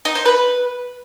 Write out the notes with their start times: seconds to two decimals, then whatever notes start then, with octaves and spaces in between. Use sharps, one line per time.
0.05 D#4
0.15 C5
0.26 B4